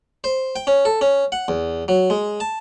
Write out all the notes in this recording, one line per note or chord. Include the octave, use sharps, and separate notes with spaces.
C5
G5
C#4
A4
C#4
F#5
E2
F#3
G#3
A5